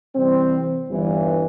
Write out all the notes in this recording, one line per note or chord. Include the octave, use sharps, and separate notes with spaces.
C2 C3 E3 G3 C4
G1 G2 E3